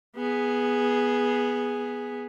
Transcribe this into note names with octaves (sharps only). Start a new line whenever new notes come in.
B3 G#4